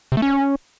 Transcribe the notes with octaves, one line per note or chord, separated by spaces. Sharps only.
C3
A3
C#4